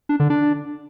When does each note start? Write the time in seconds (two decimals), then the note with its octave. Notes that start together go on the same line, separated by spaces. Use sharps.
0.09 D4
0.20 D3
0.30 D4